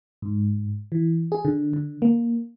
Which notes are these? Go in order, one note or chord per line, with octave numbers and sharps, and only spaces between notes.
G#2
E3
G#4
D3
D3
A#3